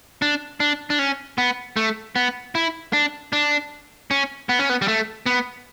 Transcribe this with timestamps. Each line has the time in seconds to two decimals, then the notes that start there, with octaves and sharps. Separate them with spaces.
0.22 D4
0.60 D4
0.90 D4
0.99 C#4
1.38 B3
1.77 A3
2.16 B3
2.55 E4
2.93 D4
3.33 D4
4.11 C#4
4.49 B3
4.59 C#4
4.70 B3
4.82 G3
4.88 A3
5.26 B3